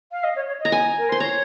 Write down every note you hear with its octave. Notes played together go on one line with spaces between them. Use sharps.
F5
D#5
C#5
C#5
D#5
A#5
G#5
A#4
C5 C6
C#5 A#5